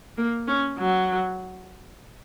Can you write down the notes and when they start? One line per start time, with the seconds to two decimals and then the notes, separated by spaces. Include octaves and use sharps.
0.17 A#3
0.48 C#4
0.78 F#3